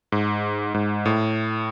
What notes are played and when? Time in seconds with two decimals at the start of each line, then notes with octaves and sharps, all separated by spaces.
0.12 G#2
0.74 G#2
1.06 A2